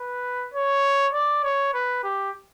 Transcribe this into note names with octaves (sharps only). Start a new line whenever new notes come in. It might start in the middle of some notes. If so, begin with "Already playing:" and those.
Already playing: B4
C#5
D5
C#5
B4
G4